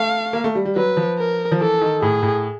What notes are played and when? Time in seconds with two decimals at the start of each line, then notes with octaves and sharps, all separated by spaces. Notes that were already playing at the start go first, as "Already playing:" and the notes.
Already playing: A3 F5
0.33 A#3
0.44 A3
0.55 G3
0.65 G3
0.76 F#3 B4
0.97 F3
1.18 A#4
1.52 F3
1.60 E3 A4
1.81 D#3
2.01 A2 G#4
2.23 A2